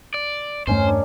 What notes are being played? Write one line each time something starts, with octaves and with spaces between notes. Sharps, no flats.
D5
E2 G2 D#3 A3 C#4 C5
D4 C#5